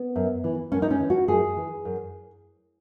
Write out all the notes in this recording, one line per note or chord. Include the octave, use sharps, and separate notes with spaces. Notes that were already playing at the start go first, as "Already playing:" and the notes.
Already playing: B3
F#2
E3
F#2 C#4
D#4
C#4
E3
F#4
F#2 G#4
E3
F#2